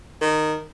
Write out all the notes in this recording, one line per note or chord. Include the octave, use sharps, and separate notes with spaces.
D#3